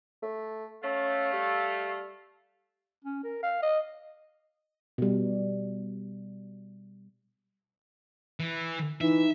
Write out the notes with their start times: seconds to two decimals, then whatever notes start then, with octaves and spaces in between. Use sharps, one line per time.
0.23 A3
0.83 A3 C#4 F5
1.33 G3
3.04 C#4
3.24 A#4
3.43 F5
3.62 D#5
4.98 B2 G3
8.40 E3
9.01 E3 D#4 E5